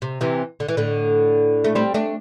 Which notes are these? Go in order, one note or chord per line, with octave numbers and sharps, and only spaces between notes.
C3
C3 E3
D3
E3
A2 D3
A3
G3 C4
A3 D4